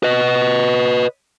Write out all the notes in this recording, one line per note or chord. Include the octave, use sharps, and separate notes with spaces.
B4 D#5